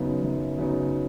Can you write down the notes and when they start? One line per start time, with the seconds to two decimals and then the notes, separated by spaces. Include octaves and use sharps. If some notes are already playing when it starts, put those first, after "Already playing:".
Already playing: F#2 C#3 F#3 B3 D#4
0.22 F#2
0.58 C#3 F#3 B3 D#4